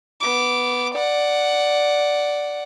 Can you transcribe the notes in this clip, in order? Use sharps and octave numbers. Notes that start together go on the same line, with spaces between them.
B3 D6
D5 F#5